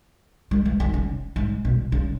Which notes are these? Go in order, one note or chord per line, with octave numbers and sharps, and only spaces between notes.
G#3
E3
D#3
C#3
G#2
B2
C#3